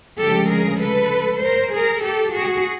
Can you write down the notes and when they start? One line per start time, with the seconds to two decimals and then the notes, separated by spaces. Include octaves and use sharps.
0.20 D2 C#3 F3 G#3 G4 A4
0.51 G#4 A#4
0.81 A4 B4
1.43 A#4 C5
1.74 G#4 A#4
2.04 G4 A4
2.34 F#4 G#4